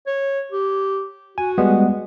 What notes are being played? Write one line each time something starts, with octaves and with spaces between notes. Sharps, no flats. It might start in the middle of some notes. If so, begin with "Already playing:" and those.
C#5
G4
F#4 G#5
G3 G#3 B3